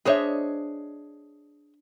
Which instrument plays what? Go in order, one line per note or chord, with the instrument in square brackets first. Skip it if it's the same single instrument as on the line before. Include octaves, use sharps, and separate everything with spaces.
[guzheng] D4 C5 D#5 [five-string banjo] G#4 C#5 E5